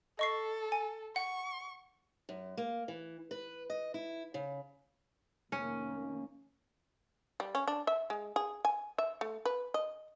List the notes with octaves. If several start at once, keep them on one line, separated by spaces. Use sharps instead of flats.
A4 D#5 C#6 C7
G#5
F#5 C#6
F#2
A#3
E3
B4
D#5
E4
C#3
F1 D#3 A#3 C#4
G3
C#4
D4
E5
G#3
G#4
G#5
E5
A3
B4
D#5